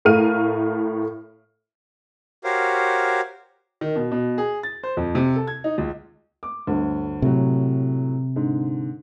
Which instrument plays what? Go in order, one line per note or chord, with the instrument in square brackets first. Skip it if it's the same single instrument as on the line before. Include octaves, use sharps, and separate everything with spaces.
[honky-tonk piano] A2 A3 A#4 F5 F6 D#7
[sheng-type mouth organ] F#4 G4 A#4 C5 C#5 F5
[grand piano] D#3
B2
B2
G#4
A6
C5
F2
C3
A4
G#6
D#4
C#2
[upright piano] D6
G1 D2
[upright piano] A2 F#3 [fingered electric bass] C3
[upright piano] G#2 D3